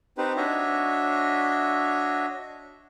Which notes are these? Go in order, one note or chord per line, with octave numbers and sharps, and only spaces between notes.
C4 D#4 G4 B4 C5
D4 F#4 C#5 D#5 E5